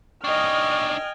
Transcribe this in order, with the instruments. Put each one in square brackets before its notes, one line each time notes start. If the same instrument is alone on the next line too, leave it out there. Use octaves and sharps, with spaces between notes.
[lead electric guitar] D4 D#4 [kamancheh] D#5 F6 [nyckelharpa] G5 G#5 [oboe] C#6